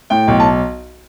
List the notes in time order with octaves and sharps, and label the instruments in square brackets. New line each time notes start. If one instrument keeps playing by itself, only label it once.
[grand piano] A2 G5
B1
A5